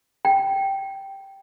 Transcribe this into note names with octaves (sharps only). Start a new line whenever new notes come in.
G5